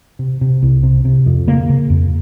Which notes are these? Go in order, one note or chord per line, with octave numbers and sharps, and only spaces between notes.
C3
C3
C2
C3
C3
F2
C#3 A#3
C#3
F2